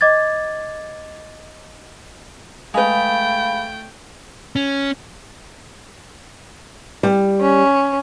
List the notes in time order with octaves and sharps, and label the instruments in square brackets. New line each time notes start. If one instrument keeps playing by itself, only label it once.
[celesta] D#5 D6 G#6 A6
[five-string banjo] G#3 B4 [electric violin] A3 G5 [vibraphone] F5 B5
[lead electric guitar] C#4
[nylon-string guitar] G3
[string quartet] C#4